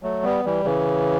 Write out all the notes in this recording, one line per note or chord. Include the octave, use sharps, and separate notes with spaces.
F#3 A3
G3 B3
E3 G3
C#3 E3